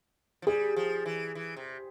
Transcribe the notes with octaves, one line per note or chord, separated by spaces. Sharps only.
F3
G3 G#4
F3
E3
E3
C3